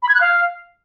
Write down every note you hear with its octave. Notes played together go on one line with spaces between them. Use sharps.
B5
G#6
F#6
F5